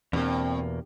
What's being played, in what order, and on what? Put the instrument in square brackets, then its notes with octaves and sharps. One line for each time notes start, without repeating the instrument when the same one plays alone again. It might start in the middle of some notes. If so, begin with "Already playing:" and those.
[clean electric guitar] E2 B2 A#3 [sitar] G2 [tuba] C4